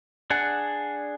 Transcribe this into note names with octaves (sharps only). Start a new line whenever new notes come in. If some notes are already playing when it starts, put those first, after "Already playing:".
D4 G#4 F#5